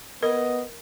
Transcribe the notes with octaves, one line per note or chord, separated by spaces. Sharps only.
B3 A#4 D#5